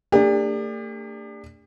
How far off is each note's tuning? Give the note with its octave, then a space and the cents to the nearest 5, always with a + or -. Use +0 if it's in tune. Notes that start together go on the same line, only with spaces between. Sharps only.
A3 +45 D4 +0 G4 +40